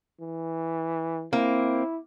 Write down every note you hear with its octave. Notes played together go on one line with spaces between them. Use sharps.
E3
A#3 C4 E4